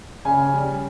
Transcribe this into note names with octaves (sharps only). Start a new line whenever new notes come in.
C#3 G#5
G3